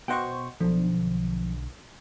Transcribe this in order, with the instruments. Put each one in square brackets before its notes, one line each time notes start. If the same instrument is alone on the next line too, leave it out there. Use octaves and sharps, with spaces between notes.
[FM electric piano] B2 C5 C#6 [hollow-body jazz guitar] D#5 F#5 G5
[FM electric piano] B1 D3 [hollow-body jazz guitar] F3